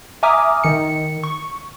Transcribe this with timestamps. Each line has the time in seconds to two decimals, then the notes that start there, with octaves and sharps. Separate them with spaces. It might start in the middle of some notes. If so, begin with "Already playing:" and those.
0.23 E5 G#5 A#5 D6 D#6 F6
0.64 D#3 C#7
1.23 C#6